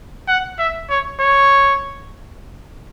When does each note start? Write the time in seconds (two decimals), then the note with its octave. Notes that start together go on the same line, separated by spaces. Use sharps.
0.28 F#5
0.59 E5
0.90 C#5
1.20 C#5